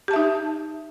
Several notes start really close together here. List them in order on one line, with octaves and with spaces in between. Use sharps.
G4 A5 E5 D#4